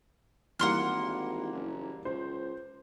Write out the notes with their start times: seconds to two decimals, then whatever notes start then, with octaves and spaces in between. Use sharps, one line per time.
0.59 G#1 E3 G3 A#3 F#5 C6 F6
1.53 F#1
2.05 C#2 C5